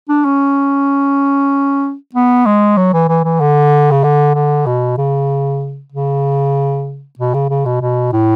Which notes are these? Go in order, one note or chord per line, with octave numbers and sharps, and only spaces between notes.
D4
C#4
B3
G#3
F#3
E3
E3
E3
D3
C#3
D3
D3
B2
C#3
C#3
B2
C#3
C#3
B2
B2
A2